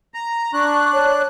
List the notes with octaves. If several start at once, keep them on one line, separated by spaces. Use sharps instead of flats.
A#5
D4 C#6 F#6
C#5